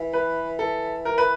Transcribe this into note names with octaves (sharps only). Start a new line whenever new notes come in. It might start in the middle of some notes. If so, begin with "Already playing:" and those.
Already playing: E3
B4
A4
A#4
B4